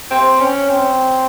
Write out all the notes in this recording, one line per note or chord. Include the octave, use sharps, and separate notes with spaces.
C4
C#4
C4